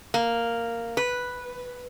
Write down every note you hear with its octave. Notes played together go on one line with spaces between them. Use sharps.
A#3
B4